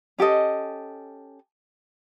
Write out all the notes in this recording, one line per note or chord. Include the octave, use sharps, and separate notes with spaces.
C#4 G4 A4 D#5